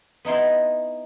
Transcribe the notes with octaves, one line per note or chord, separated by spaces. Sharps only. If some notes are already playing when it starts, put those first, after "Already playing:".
B3 D#4 E4 C6